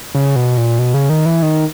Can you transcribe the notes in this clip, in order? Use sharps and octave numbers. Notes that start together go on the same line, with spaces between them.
C#3
B2
A#2
B2
C#3
D#3
E3
D#3